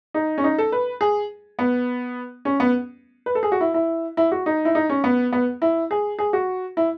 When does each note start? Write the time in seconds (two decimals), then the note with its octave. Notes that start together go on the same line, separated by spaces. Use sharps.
0.14 D#4
0.38 C#4
0.44 D#4
0.58 A4
0.72 B4
1.01 G#4
1.59 B3
2.45 C#4
2.60 B3
3.26 B4
3.35 A4
3.43 G#4
3.52 F#4
3.61 E4
3.74 E4
4.17 E4
4.32 F#4
4.46 D#4
4.65 E4
4.75 D#4
4.89 C#4
5.04 B3
5.33 B3
5.62 E4
5.91 G#4
6.19 G#4
6.33 F#4
6.77 E4